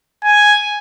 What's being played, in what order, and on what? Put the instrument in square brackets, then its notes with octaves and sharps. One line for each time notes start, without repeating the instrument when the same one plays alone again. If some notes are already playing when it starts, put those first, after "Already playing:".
[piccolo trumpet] G#5